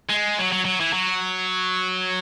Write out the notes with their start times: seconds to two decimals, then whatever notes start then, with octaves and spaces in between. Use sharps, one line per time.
0.09 G#3
0.38 F#3
0.52 F#3
0.65 F#3
0.80 E3
0.93 F#3